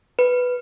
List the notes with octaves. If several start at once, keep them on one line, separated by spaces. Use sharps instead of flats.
B4